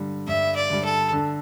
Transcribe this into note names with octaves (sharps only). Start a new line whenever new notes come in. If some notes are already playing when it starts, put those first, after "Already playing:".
Already playing: G2 D3 G3
G2 E5
D5
D3 G3
A4
D3